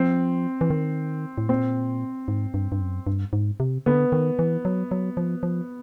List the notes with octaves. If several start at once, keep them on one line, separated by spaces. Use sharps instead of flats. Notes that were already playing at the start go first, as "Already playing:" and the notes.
Already playing: F3 C4
E3
D#3
A2
A#2 C4
G#2
G2
G2
F#2
G2
G#2
C3
D3 B3
D#3
E3
F#3
F#3
F3
F3